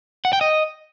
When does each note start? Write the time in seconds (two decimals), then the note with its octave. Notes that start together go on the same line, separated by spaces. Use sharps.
0.25 F#5
0.33 G5
0.41 D#5